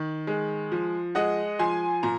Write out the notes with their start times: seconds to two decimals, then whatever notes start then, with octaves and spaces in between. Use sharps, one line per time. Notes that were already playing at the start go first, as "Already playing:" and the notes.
Already playing: D#3
0.27 G#3
0.72 F3
1.15 G#3 D#5 F#5
1.59 F3 G#5 C6
2.03 A#2 A#5